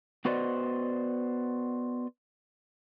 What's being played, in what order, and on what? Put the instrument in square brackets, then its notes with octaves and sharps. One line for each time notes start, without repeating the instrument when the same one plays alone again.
[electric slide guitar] B3 F#4 B4 C5 D5 D#5